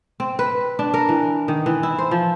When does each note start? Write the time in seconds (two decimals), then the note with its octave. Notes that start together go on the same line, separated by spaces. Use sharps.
0.20 C4
0.39 B4
0.79 D4
0.94 A#4
1.09 E3
1.48 D#3
1.66 E3
1.83 E4
1.98 C5
2.11 F3